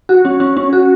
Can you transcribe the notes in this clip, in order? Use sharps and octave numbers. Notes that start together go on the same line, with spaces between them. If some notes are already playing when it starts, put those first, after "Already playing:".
F#4
C#4
C#4
C#4
F#4